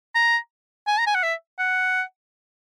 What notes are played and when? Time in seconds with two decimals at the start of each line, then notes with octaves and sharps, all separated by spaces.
0.15 A#5
0.87 G#5
0.99 A#5
1.07 G#5
1.15 F#5
1.23 E5
1.59 F#5